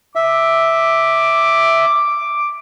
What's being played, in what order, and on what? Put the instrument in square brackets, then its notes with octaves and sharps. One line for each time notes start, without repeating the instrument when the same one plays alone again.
[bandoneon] E5 [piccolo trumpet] D6